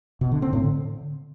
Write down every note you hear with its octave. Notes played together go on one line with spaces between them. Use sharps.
B2
D3
C4
A2
D3